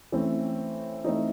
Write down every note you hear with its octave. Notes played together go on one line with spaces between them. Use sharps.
E3 A3 C4 C#4
E3 A3 C4 D#4